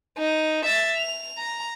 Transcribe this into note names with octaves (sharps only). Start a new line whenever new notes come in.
D#4
E5 A6
F7
A#5